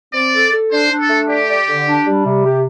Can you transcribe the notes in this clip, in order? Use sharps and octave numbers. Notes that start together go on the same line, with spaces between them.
C4 D5
A4
A4
D4 C5
D4
A4
A3
G4 D5
D5
D3
D4
G3
C3
G4